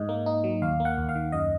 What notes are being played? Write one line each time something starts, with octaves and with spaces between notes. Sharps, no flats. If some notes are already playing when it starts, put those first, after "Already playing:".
Already playing: G#2 D#5
A#3
D#4
F#3
D#2 F5
A#3
F#5
D#2
F5
D#3
F#2 D#5